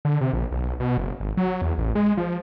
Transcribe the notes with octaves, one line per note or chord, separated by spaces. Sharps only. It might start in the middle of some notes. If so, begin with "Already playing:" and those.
D3
C3
A#1
B1
B2
F#1
G#1
F#3
E2
A1
G#3
F3